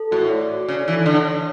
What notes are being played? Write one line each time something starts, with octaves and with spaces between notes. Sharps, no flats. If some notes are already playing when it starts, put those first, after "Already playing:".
Already playing: A4
A2 F#4
D5
D5
C#3 D4
E3 A4
D3 C#5
C#5